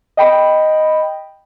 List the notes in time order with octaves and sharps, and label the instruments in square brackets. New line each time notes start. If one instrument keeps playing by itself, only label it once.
[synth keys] D#5 G5 B5